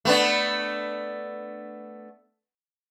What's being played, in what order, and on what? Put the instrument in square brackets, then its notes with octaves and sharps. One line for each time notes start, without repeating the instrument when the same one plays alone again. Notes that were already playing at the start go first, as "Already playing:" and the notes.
[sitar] A3 B3 D4